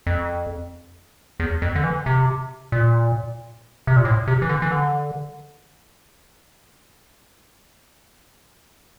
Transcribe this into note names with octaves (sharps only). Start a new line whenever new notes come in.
F2
E2
F2
D3
E3
C3
A#2
C3
A#2
A2
C3
E3
D3
E3
D3